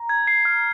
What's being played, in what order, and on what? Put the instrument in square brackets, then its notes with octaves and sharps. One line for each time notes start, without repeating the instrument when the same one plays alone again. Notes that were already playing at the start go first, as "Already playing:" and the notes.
Already playing: [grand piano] A#5
[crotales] G#6
C7
F6